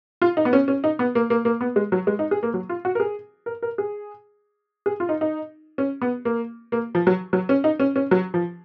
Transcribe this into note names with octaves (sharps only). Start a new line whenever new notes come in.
F4
D#4
B3
C#4
C#4
D#4
B3
A#3
A#3
A#3
B3
G#3
F#3
G#3
D#4
G#4
A#3
F#3
F4
F#4
A#4
G#4
A#4
A#4
G#4
G#4
F4
D#4
D#4
C#4
B3
A#3
A#3
F3
F#3
F#3
C#4
D#4
C#4
C#4
F#3
F3